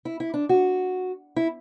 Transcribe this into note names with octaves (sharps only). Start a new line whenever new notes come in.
E4
E4
D4
F#4
E4